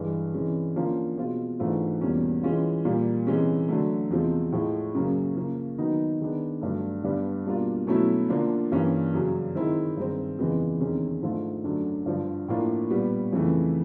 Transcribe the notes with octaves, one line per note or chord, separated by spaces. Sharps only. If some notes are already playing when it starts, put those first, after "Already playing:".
Already playing: G2 E3 G#3
C3 E3 G#3 C#4
D3 F3 A#3 C#4 F4
B2 G#3 C4 F4
G#2 E3 A3 D4 F4
E2 B2 G3 A#3 C#4
E3 G#3 C#4 F4
A#2 G3 A#3
C3 E3 G#3 C#4
D3 F#3 A3
E2 C3 F3 G#3
A2 F3 G#3
F#2 C#3 F#3 A#3 C#4
C#3 F3 A#3
D#3 F#3 B3 D#4
D#3 G#3 B3 D4
G2 D3 F#3 A3
G2 D3 G3 B3 D4
B2 G3 A#3 D4 F4
B2 F#3 A3 C#4 E4
D3 F3 A#3 D4 F4
G2 E3 G3 A#3 C#4
F#2 C#3 F#3
D#3 G#3 C4 E4
G2 D#3 G#3 C4
F2 C#3 E3 G#3 B3
E2 C3 D#3 G#3 C#4
G#2 F3 A3 D4 F4
F#2 D3 F#3 A3 D4
G2 D3 F3
A2 F3 A#3 D4 F4
A#2 G3 B3
F2 C#3 E3 A3